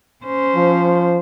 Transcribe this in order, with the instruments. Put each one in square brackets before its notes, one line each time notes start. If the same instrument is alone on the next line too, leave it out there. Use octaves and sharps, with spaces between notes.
[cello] C#4 C5
[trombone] F3